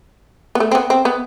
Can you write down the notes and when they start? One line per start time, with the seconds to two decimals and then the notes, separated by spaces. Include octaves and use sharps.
0.55 B3
0.60 A3
0.71 C4
0.75 B3
0.90 C4
1.05 B3